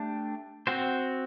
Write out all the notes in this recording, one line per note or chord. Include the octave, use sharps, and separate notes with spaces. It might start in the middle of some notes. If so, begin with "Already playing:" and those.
Already playing: A3 D4 G4
C4 F#4 C5